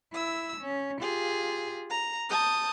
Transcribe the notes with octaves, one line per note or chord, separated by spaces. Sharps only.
E4 E6
C#4
F4 G4 G#4
A#5
A5 D#6 G6